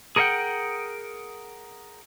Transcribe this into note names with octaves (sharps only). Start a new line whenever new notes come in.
G#4 A#4 C#5 E5 F#5 G5